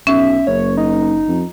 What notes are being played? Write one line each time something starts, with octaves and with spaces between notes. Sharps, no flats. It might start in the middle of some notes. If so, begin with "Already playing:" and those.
B1 C#4 E5
F#1 C#5
D#4
F2